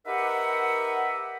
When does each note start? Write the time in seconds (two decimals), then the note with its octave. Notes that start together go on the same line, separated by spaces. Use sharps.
0.06 D#4 G4 A#4 B4 E5 F#5